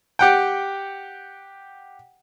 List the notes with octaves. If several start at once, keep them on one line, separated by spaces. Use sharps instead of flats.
G4 F#5 G5